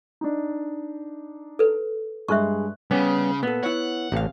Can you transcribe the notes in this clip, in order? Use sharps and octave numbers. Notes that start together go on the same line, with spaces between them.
D4 D#4
A4 B4
G2 G#3 E5 C#6 F#6
C#3 G3 B3 C#4
A#2 B3 A4
E4 C#5 F#5
A1 C3 F5